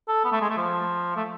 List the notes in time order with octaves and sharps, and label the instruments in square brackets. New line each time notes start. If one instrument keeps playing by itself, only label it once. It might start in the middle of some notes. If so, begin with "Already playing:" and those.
[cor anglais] A4
B3
A3
G#3
A3
F3
A3